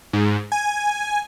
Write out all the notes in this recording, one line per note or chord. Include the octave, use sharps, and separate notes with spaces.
G#2
G#5